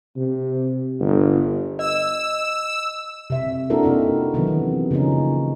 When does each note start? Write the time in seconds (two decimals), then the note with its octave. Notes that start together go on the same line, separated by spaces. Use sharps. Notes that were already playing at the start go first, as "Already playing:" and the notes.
0.17 C3
1.00 G1
1.79 D#5 E6
3.30 C3 E5
3.70 A#3 D4 E4 F#4 A4 A#4
3.83 C3 C4 D#4 E4
4.34 C3 D#3 E3 F#3 B3
4.47 D#3
4.91 C#3 F3 A#3 C#4 D#4